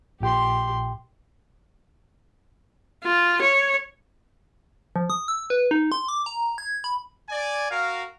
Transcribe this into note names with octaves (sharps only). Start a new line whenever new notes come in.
A#1 A#2 G4 G5 C6
F4
C#5
F3
D#6
E6
B4
D#4
C6
D6
A#5
G#6
B5
D5 G#5
F#4 A#4 F5